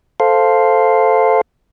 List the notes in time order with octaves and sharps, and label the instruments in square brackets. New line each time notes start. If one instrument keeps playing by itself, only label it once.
[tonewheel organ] A4 C5 F5